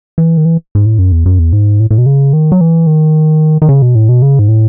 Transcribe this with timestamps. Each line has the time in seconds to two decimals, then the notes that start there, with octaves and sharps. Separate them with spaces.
0.18 E3
0.37 D#3
0.45 E3
0.75 G#2
0.85 A2
0.98 F#2
1.12 E2
1.26 F#2
1.39 E2
1.53 G#2
1.80 A2
1.91 A2
1.98 B2
2.06 C#3
2.33 D#3
2.52 F#3
2.61 E3
2.87 D#3
3.62 D#3
3.69 C#3
3.82 B2
3.95 A2
4.09 B2
4.22 C#3
4.39 G#2
4.48 A2